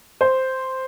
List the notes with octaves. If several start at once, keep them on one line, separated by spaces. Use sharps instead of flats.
C5